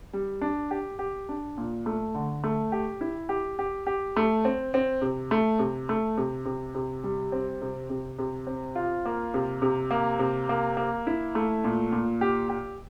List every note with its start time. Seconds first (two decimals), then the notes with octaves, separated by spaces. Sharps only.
0.13 G3
0.42 D4
0.71 G4
0.99 G4
1.29 D4
1.58 A#2
1.86 A3
2.14 D3
2.44 A3
2.72 G4
3.01 E4
3.29 G4
3.59 G4
3.87 G4
4.16 A3
4.45 C4
4.74 C4
5.02 C3
5.31 A3
5.59 C3
5.89 A3
6.17 C3
6.45 C3
6.75 C3
7.04 G3
7.32 C4
7.62 C3
7.90 C3
8.19 C3
8.47 C4
8.75 F4
9.05 A#3
9.34 C3
9.62 C3
9.91 A#3
10.19 C3
10.49 A#3
10.77 A#3
11.07 E4
11.35 A3
11.64 A#2
11.92 A#2
12.21 G4
12.49 G4